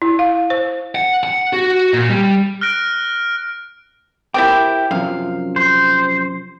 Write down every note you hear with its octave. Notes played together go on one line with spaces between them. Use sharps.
E4
F5
C5
F#5
F#5
F#4
A#2
G3
F6 F#6 A#6 D7
E4 G4 A#4 C5 G5 D6
F#2 C3 F3 F5
C5